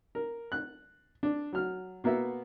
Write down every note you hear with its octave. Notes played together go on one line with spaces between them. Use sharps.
A#4
F#6
D4
F#3 F6
B2 A#3 B3 E5